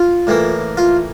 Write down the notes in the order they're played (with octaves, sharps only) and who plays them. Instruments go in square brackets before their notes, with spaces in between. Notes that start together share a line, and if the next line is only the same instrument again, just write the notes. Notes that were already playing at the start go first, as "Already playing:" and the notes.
Already playing: [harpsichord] F4
A2 E3 A#3
F4